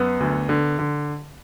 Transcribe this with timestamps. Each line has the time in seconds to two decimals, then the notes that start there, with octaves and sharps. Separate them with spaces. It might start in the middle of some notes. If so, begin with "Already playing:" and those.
Already playing: F#2 B3
0.20 D2
0.49 D3
0.79 D3